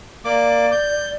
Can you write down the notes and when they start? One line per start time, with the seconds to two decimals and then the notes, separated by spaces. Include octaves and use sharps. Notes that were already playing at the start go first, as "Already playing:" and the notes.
0.25 A#3 D5 D6
0.72 G6